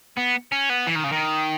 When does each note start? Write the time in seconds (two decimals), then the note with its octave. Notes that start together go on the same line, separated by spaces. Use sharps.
0.18 B3
0.52 C#4
0.69 B3
0.87 E3
0.95 D#3
1.04 C#3
1.12 D#3